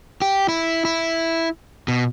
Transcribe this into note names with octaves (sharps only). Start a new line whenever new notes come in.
G4
E4
E4
B2